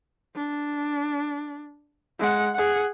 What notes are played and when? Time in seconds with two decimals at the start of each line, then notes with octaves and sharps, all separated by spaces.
0.36 D4
2.19 G#3 F#5
2.55 G#4 F#5